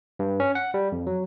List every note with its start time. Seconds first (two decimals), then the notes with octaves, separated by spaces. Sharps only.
0.19 G2
0.40 C#4
0.55 F#5
0.74 G3
0.92 F2
1.07 F#3